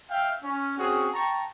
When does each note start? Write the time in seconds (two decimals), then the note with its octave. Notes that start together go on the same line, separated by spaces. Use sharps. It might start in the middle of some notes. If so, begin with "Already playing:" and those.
0.11 E5 F5 G5
0.42 C#4
0.78 C4 C#4 F#4 G#4
1.14 G5 A5 A#5 C#6